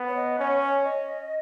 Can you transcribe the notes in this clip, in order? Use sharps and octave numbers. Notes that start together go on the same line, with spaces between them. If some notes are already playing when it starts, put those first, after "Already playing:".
Already playing: B3
C#5
D#5
C#4 C#5
C#5
D#5